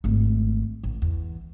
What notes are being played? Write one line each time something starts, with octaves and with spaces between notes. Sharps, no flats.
G#1 A3
A1
E2